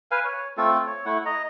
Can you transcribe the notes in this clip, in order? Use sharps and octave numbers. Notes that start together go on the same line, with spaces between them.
B4 F5 G#5
C#5
A3 C4 F4 A4
C#5
A3 E4 F#5
D#5 A#5